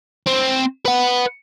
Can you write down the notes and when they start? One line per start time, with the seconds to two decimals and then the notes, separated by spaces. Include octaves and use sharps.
0.27 C4
0.85 B4 F#5